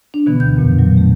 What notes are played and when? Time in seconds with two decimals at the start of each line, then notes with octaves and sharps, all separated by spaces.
0.14 D4
0.26 B2 D3 E3 B3
0.40 D2 G6
0.57 F2 A#2 F3
0.79 F#3
0.97 A3